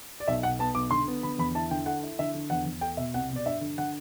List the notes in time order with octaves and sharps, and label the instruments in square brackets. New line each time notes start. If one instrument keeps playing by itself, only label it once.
[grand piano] D5
B1 E5
B1 F#5
B3 A5
B1 D6
D3 C6
B3
D3 B5
E2 B5
E4 A5
D3 G5
A3 F#5
E4
D3 E5
D3
E2 F#5
E2
A3 G5
B2 E5
C2 F#5
B2
D5
G2 E5
D3
D3 F#5